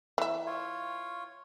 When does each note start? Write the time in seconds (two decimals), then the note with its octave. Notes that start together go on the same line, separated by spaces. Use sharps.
0.18 E3 E5
0.47 F4 C#5